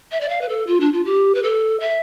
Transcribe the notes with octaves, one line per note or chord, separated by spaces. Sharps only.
E5
D5
F5
B4
A4
F4
D4
F4
G4
B4
A4
E5